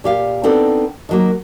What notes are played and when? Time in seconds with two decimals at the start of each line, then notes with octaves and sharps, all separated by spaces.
0.04 A#2 G4 F5
0.43 B3 C4 D4 D#4 A4
1.09 D#3 F#3 A#3